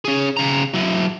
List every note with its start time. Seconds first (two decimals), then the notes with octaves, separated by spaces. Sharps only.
0.05 C#4 G#4
0.37 C#3 A#5
0.74 F#3 E4